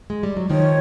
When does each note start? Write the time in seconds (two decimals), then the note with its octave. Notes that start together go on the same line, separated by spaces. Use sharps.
0.10 G#3
0.23 G3
0.37 F#3
0.50 D#3 F3 C#5